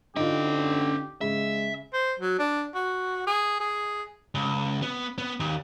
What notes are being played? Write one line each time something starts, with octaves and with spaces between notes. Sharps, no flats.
D3 C#4 D#4 F4 G4 G5
C#3 G#3 E5
C5
F#3
D4
F#4
G#4
G#4
C#2
B3
B3
D#2